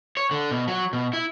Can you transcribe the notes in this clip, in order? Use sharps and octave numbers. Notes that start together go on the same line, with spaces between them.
C#5
D3
B2
F#3
B2
E4